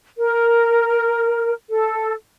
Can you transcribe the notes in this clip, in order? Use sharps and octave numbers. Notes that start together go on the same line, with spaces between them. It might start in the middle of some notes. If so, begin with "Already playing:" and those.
A#4
A4